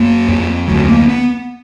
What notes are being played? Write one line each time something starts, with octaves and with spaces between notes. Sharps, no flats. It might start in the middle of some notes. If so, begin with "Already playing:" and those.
Already playing: F#2 A#3
F2
D2 F#3
A#3
B3